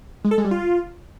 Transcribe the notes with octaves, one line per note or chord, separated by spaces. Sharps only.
G#3
A4
G#3
G3
F4